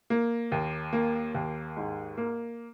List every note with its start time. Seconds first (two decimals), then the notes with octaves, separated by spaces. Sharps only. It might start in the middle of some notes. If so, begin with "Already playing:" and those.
0.10 A#3
0.52 D#2
0.93 A#3
1.34 D#2
1.77 G#2
2.17 A#3